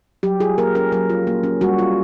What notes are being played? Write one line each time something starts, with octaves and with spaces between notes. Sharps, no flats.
F#3 G4
F4 G#4
A#3 A#4
C#4 A#4
F#3 A#4
F4
A#3
C#4
G3 F#4
F4